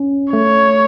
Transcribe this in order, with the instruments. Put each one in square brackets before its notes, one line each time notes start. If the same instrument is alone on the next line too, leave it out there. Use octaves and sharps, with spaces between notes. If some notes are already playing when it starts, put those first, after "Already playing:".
Already playing: [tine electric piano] C#4
[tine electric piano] A3 [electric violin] C#5